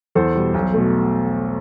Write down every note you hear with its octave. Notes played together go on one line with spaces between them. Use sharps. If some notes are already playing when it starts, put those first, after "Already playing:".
E2 A4 C5
B2 G3
B1
B2 A3